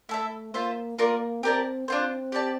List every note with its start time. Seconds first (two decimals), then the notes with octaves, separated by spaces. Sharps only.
0.09 A3 E4 A4 E5
0.54 A#3 F4 C5 E5
0.98 A#3 F4 A#4 D5
1.43 C4 G4 A#4 D5 A5
1.88 C4 D4 F4 C5
2.32 G4 D5 A5